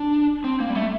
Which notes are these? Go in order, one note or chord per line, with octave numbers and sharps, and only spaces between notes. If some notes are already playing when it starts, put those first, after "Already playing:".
Already playing: D4
C4
A#3
G3
A3